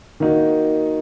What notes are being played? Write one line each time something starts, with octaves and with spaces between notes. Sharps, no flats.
D#3 A#3 D#4 F#4